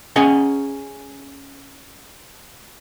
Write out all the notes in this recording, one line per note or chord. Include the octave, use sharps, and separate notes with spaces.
C#4 G#4 D#5 F#5 A#5